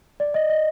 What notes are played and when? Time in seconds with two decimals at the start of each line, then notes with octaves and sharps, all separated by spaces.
0.20 D5
0.34 D#5
0.49 D#5